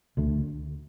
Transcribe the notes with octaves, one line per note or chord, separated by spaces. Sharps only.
D2 D3 A3 D4